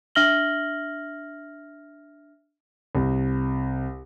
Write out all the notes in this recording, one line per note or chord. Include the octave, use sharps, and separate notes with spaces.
D4 E5 F6 A#6 F#7 G7
C2